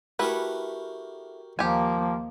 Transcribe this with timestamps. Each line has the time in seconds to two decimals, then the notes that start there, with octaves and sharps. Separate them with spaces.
0.19 A3 E4 F#4 G4 A#4 B4
1.59 D#2 F3 A#3 G4 G#5